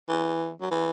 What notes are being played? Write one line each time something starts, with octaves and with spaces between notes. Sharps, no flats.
E3
F#3
E3